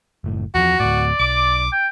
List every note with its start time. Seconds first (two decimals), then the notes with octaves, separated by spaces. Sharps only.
0.24 F#1 A2
0.55 E2 E3 F3 F#4 A#5
0.80 D2 A2 D5
1.20 B1 D6
1.72 G5